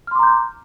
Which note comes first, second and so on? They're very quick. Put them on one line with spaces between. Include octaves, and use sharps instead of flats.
F6 C6 D6 A#5 G6